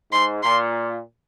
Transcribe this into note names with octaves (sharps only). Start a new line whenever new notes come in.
G#2 C6
A#2 C6